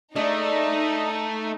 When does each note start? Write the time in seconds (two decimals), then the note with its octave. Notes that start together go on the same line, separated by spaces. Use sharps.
0.16 A3 D4 D#4 G#4 D5 D#5